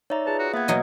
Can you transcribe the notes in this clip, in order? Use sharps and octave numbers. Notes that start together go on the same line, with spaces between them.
D#4 C#5 D5 E5 A#5
F4 G#4 B4 A5
F#4
A#3 B3 E5 F#5 G#6
B2 F#3 D#5